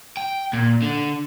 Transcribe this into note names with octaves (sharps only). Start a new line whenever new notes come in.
G5
A#2
D3